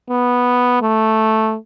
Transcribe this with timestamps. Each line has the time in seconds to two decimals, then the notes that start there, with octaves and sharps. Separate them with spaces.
0.10 B3
0.82 A3